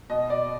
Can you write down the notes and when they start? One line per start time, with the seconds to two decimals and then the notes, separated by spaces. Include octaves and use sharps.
0.10 B2 D#5
0.30 D5